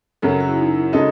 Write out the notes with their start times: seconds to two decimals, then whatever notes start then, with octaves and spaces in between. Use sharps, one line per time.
0.22 F#2 C#3 F#3 A4
0.31 G#4
0.40 F#4
0.48 E4
0.57 D#4
0.75 E4
0.93 C#3 G#3 D#4 F#4 A4